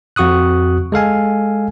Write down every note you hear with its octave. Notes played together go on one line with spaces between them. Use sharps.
F2 F#4 C#6 D#6 F#6
G#3 A4 F5 G#5